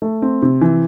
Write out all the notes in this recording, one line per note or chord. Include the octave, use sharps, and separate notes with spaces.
A3
C4
C3
E3